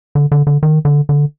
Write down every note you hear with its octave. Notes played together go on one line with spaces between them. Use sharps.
D3
D3
D3
D#3
D3
D3